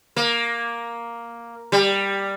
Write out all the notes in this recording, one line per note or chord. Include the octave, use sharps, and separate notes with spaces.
A#3
G3